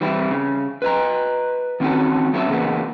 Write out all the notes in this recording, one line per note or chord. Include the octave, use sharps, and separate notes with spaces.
E3 G3 C4 E4
C#3
B4 D#5 A#5
D#3 C4 C#4 F4 F#4 A4
F#3 B3 C#4 E4 A4 E5
C#3 E3 G#3 A#3 B3